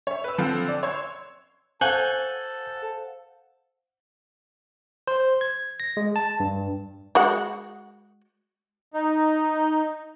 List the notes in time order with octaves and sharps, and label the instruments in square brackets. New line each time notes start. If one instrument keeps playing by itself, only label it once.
[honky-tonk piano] C#5 E5
B4 E6
D3 F3 C4 A4 F5 F#6
D5
C#5 C6 E6 G#6
[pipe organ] A4 [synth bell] C5 F5 F#5 [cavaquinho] G#5 [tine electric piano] F#6 G6
[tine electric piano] C5
G#6
A#6
G#3
A5
G2
[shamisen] G#3 F#4 F#5
[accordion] D#4